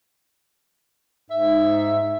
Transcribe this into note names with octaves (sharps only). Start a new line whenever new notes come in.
G#2 E5